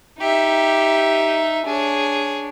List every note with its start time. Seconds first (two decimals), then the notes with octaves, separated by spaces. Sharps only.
0.20 D#4 G4 E5
1.66 D4 G#4 C#5